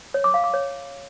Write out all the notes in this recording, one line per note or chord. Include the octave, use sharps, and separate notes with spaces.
C#5
D6
F5
D6
C#5